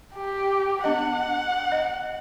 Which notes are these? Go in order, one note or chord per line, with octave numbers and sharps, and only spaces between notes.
G4
B3 D4 D#5 F#5
D#5